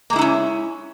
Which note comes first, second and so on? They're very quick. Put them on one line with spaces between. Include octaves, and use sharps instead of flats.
A#3 G#3 E4 D#4 C#4